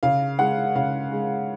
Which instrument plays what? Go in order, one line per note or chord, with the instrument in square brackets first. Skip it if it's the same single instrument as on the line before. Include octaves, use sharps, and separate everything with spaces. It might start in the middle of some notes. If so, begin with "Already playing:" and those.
[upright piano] C#3 F5
G#3 F#5
C#3 F5
G#3